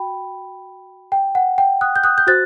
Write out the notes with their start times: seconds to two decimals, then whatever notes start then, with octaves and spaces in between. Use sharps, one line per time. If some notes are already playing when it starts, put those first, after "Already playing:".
Already playing: F#4 G5 B5
1.12 G5
1.35 F#5
1.58 G5
1.81 D#6 F#6
1.96 G6
2.04 D#6 F#6
2.18 G6
2.27 F#4 C5 F#6 A6